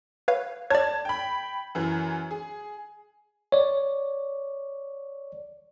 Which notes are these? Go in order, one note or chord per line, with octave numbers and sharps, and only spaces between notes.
B4 C#5 F5
C#5 D5 A5 G#6
G5 B5
F#2 E3
G#4
C#5 D5